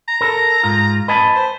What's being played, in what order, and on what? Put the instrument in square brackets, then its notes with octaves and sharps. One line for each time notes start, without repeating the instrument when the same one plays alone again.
[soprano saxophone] A#5
[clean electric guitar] A4 A#4
G#2 F4
[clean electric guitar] B4 G#5 A5 [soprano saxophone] D#5
[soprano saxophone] C5